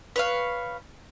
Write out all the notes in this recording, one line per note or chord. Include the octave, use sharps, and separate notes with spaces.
B4 C#5 F5